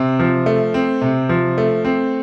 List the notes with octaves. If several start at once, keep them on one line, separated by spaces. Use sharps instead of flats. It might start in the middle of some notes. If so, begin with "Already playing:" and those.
Already playing: C3 C4
F3
A3
C4
C3
F3
A3
C4